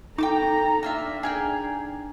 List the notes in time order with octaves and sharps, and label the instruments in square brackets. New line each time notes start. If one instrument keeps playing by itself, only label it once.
[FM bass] D#4 [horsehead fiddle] A4 A#5 [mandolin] G5 A5 D6
[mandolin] A#3 F4 E5 [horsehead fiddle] D4
[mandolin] G#4 A#4 G5